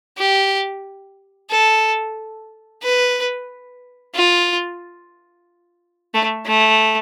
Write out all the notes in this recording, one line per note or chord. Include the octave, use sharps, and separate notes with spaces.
G4
A4
B4
F4
A3
A3